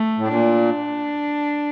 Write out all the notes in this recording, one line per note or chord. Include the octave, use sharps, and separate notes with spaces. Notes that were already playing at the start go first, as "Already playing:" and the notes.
Already playing: A3
A2
A#2 D4